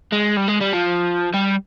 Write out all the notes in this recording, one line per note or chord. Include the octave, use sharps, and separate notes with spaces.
G#3
G3
G#3
G3
F3
G3